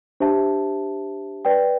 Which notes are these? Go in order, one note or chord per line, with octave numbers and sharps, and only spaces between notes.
D4 G4 C5 E5 A5
B4 D5 G5